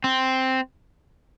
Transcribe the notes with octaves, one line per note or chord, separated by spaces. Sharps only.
C4